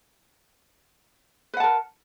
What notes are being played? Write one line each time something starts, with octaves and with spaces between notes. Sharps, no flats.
A#4 B4 F#5 A5